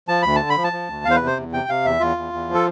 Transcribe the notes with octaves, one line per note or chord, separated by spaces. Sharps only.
F3 A5
D2 B5
D3 A5
B5
F3
A5
F3
D2
E2 F5
C5
B4
C3
C5
E2
C3 G5
C3 F5
E2 E5
E2 F4
E2
E2
F3
A4